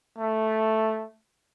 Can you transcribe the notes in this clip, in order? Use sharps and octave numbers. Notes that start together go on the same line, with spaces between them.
A3